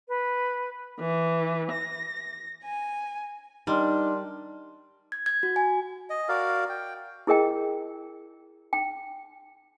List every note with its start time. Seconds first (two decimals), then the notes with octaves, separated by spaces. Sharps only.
0.08 B4
0.98 E3
1.72 A#6
2.63 G#5
3.67 G3 D4 D#4 A#4 C6 F6
5.12 G#6
5.26 G#6
5.43 F#4
5.56 G#5
6.10 D#5
6.29 F#4 A#4 D5 F5
6.69 G5
7.27 E4 G#4 A#4 D#5 G5
8.73 G5